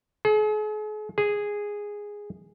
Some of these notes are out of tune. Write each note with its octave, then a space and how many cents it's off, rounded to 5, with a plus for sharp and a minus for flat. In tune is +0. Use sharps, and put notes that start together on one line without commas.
G#4 +45
G#4 -5